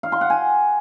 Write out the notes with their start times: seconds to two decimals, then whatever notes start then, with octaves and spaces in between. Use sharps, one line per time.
0.03 F5
0.12 C6
0.21 F#5
0.30 G#5